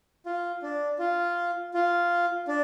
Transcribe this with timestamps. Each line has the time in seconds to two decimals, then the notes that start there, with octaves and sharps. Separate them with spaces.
0.26 F4
0.62 D4
0.99 F4
1.74 F4
2.48 D4